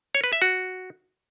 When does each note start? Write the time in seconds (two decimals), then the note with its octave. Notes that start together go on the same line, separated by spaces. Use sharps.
0.15 C#5
0.24 B4
0.33 E5
0.42 F#4